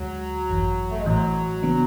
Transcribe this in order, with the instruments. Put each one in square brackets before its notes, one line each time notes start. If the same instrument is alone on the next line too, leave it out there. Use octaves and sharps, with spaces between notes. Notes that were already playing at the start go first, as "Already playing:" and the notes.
Already playing: [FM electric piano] D2 D3 G#3 [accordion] F#3
[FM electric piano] G#1 F#2 E3
[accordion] A3
G#3
[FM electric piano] A1 A2 E3 [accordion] F#3
[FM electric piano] C#3 E3 B3 D4